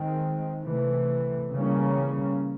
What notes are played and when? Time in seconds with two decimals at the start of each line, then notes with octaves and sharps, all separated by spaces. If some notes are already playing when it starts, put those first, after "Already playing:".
Already playing: D#3 G#3 C4
0.63 C3 E3 A3
1.52 C#3 E3 G3 A#3 C#4